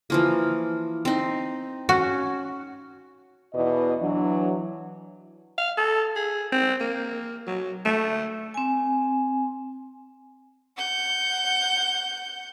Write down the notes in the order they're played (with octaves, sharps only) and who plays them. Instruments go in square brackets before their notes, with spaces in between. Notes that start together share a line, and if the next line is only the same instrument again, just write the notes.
[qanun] E3 F3 A#3
C4 D#4
[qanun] C#4 [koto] F#4
[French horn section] E2 B2 E4 B4 D5 D#5
E3 F#3 D4
[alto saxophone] F5
A4
G#4
C4
A#3
F#3
A3
[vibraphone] C4 G#5
[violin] F#5 G6